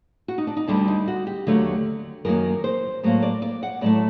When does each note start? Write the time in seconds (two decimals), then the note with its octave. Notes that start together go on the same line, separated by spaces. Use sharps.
0.28 F#4
0.38 D#4
0.47 D4
0.57 D#4
0.67 D2 D3 G3 D4
0.88 D#4
1.08 F#4
1.27 G4
1.47 D#2 D3 F#3 A3
2.25 F#2 D#3 F#3 A#3 A#4
2.64 C5
3.03 A2 F#3 A#3
3.22 D5
3.42 D5
3.63 F#5
3.81 A2 F#3 A3 D5